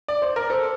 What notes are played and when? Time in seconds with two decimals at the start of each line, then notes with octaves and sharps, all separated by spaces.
0.08 D5
0.22 C5
0.36 A#4
0.50 A4 C5